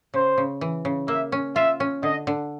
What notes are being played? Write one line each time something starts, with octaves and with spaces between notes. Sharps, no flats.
C#3 C5
C#3
E3
C#3
A#3 E5
C#4
F4 E5
C#4
D3 D#5
D3